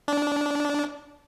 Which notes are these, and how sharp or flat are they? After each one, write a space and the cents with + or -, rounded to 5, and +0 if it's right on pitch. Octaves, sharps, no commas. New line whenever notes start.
D4 -15